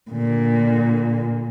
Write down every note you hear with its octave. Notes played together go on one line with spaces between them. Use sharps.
A#2 D3